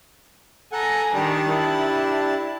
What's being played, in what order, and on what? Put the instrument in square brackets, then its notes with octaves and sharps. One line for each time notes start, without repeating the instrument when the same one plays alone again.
[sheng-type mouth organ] A4 F#5 [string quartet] G#5 A#5
[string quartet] D#3 G3 [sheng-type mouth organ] D4 G4 A5
[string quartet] E4